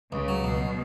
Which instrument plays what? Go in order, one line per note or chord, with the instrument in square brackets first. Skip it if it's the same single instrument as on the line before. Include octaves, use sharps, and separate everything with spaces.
[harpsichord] C#2 [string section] C#3
[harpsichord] F#3
[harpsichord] C#2 [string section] B2